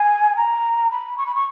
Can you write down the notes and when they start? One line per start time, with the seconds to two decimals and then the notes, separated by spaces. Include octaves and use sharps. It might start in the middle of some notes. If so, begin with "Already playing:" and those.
Already playing: G#5
0.36 A#5
0.90 B5
1.17 C#6
1.26 B5
1.34 C#6